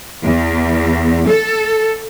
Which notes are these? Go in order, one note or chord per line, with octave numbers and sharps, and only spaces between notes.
E2
A4